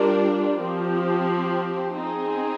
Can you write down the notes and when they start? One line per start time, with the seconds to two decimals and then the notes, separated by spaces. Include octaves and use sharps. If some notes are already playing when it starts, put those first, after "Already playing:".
Already playing: G3 D4 F4 A#4 D5
0.58 F3 C4 G4
1.94 C4 D#4 G#4